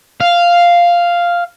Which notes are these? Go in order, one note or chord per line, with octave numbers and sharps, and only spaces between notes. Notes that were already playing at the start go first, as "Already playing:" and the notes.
F5